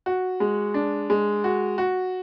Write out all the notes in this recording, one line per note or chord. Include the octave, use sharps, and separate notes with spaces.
F#4
G#3
D4
G#3
F#4
F#4